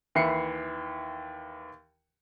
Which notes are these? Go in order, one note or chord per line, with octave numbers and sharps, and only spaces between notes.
D#2 E3 B4 E5 C7 C#7